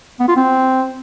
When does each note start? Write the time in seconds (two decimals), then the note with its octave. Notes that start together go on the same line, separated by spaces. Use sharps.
0.20 B3
0.28 F4
0.36 C4